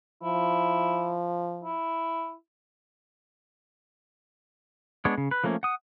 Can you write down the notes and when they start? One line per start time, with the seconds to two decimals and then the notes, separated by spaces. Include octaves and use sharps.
0.23 F3 E4
1.64 E4
5.05 G#3 B3 D4 C#5
5.18 C#3
5.31 B4
5.44 F3 A3 A#3 C#4
5.63 F#5 D#6